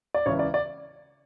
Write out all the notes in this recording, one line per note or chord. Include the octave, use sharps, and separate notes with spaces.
D5
C#2 C#3 E3 C#5
D5
D5